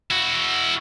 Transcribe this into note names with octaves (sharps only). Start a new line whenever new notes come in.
E4 F#4